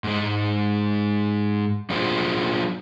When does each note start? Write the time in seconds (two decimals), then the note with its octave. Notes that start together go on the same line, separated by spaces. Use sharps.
0.04 G#2 G#3
1.90 F#3 D4 F4 G#4 C5